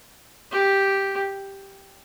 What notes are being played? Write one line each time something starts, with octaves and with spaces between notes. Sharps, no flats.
G4